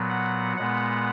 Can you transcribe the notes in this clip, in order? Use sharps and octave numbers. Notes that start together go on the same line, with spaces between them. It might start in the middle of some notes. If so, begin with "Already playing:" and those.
Already playing: A#2 F#3 B3
F#5
A#2 G#3 B3 F#5